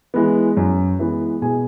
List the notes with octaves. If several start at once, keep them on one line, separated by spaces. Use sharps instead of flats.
E3 G#3 B3
F#2
E3 G#3 B3
B2 G#4 G#5